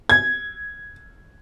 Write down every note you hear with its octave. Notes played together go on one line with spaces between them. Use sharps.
G#6